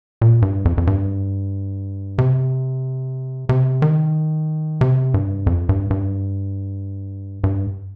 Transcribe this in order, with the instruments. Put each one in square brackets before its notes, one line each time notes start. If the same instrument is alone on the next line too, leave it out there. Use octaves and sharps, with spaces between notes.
[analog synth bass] A#2
G2
F2
F2
G2
C3
C3
D#3
C3
G2
F2
G2
G2
G2